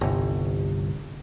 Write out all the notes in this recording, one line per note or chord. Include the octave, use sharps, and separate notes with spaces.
G1 C2